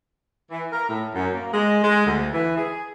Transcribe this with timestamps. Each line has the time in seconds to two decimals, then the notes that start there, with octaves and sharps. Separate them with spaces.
0.50 E3
0.72 A#4
0.88 A2
1.14 F#2
1.33 A#3
1.53 G#3
1.83 G#3
2.05 D2
2.32 E3
2.55 G#4